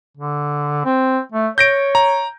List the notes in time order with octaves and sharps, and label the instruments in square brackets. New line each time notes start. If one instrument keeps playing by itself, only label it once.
[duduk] D3
C4
A3
[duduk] C#5 [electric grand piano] G6 A#6 D7
[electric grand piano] A#5